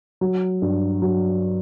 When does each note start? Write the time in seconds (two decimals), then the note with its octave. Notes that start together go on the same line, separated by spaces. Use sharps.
0.21 F#3
0.62 G2
1.02 F#3